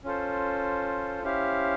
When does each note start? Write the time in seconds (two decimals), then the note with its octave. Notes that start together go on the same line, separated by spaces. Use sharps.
0.04 C#4 F4 A4 C5
1.23 C#4 E4 G4 C5 F5